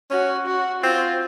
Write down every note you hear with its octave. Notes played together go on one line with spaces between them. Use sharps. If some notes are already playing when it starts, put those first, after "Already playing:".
C#4 F#4
F#4
C4 F4